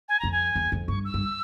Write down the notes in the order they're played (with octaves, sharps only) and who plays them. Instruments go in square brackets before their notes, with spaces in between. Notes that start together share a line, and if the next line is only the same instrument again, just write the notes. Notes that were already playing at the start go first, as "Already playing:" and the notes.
[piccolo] G#5
[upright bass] F2 [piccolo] A#5
[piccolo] G#5
[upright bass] E2
F2
[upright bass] G2 [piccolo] C#6
[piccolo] E6
[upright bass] G2